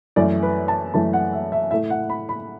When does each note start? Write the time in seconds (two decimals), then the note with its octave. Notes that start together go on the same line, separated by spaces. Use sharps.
0.16 F#2 E3 A3 D5
0.43 B4
0.68 A5
0.94 F#2 E3 A3 A5
1.13 F#5
1.33 E5
1.52 E5
1.71 A2 A3 E5
1.90 F#5
2.09 B5
2.29 B5